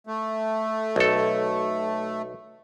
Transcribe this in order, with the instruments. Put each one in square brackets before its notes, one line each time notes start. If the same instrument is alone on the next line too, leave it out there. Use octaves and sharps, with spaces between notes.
[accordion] A3
[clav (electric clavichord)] B1 A4